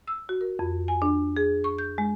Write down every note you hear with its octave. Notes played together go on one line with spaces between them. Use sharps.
E6
F#4
A#4
F2
G#5
D4
G#4
C#6
G6
G#3